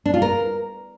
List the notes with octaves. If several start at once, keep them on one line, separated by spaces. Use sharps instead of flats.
D4
F4
A#4